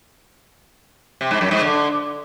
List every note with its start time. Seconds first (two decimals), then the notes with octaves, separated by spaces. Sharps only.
1.21 C3
1.31 G#2
1.41 F#2
1.51 G#2
1.61 D3